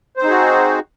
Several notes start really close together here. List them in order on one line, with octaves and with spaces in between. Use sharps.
C5 C4 D#4 G#4 F#4